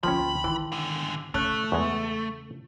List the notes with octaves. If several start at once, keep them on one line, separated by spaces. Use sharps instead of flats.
D2 F3 A#3 C#4 G5 A5 B5 C6
D#3 E3
G#2 D3
C#3 A3 C#4 C#5 A5 C#6 F#6
E2 G#3 C#6